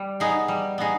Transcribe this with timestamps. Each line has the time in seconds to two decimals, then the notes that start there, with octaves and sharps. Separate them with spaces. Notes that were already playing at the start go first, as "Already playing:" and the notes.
Already playing: G3
0.20 B3 D#4 G#4
0.48 G3
0.78 B3 D#4 G#4